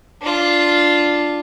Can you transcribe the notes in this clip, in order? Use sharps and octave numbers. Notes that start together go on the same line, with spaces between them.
D4 F4